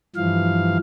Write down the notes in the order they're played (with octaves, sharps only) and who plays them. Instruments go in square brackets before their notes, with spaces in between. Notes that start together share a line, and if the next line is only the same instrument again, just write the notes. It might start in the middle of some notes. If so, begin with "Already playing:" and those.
[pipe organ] G2 E3 F3 F5